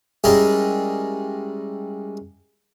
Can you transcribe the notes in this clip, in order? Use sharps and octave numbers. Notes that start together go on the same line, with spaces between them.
G3 G#3 C#4 E4 G#4 A#4